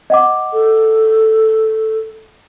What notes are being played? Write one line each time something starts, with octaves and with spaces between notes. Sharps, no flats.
D#5 F#5 D6
A4